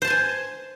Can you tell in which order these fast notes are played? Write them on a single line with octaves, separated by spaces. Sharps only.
C5 A5 C6 G#5